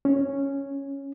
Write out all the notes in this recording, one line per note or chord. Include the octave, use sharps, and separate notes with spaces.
C#4